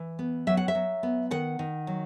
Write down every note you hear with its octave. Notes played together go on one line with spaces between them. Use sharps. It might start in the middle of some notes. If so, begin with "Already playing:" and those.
Already playing: E3
B3
F#3 E5
F#5
E5
F#3
B3
D#3 F#5
D#3
F#3